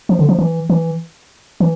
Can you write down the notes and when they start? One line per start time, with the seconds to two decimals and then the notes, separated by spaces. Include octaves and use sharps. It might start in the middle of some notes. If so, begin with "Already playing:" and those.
0.09 F3
0.19 D3
0.29 F3
0.39 E3
0.70 E3
1.60 E3